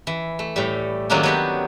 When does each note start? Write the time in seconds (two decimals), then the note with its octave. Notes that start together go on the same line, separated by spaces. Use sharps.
0.07 E3
0.39 A3
0.56 A2 G3
1.10 D#3 F#3 G#3 A#3 C#4 D4
1.23 F#3 B3 G4